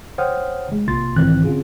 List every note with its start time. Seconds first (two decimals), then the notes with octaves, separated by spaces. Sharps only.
0.18 C5 C#5 F#5 G5 D#6 F6
0.72 G#3
0.88 B1 C3 A#3 F4 C6 A6
1.16 B1 G#2 D#3 E3 C4 F#6
1.44 D3 C4 C#4 F4 F#4 G#4